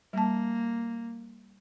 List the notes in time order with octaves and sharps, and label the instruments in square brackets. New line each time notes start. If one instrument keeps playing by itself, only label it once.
[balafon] G3 A5 [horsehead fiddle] A#3